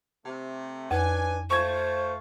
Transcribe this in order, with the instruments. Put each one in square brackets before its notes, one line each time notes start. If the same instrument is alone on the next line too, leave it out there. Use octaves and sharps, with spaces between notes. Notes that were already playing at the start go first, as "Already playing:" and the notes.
[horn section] C3 A3
[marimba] F2 [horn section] C#4 D4 G#5 [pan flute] B4
[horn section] A3 F4 [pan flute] C5 [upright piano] C#6 G#6